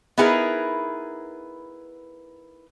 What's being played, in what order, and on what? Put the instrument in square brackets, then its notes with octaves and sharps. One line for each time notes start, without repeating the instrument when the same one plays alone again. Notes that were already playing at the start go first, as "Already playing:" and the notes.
[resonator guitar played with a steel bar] B3 D#4 E4 G#4 A#4 B4